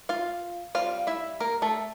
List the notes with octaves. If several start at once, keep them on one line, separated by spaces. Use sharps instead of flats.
F4 F5
G3 C4 F4 F5
E4 E5
A#3 A#4
A3 A4